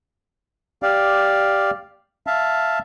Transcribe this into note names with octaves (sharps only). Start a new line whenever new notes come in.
G4 D5 F5
E5 F5 A5